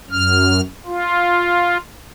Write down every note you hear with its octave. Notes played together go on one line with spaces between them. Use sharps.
F#2 F6
F4